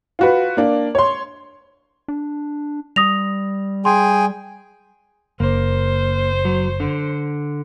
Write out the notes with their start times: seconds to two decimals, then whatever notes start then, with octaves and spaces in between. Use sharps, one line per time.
0.19 F4 F#4 B4
0.57 A#3 D4
0.95 C#5 C6
2.08 D4
2.96 G3 D#6 A#6 F7
3.85 G#4 G5 G#5 C6
5.40 F#1 A#3 C5
6.45 F#3
6.80 D3